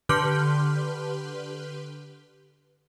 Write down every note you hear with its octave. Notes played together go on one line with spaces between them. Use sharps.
D3 G4 B4 C6 F6 G6